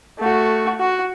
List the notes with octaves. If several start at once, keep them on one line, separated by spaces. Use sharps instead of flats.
A3 F#4
F#4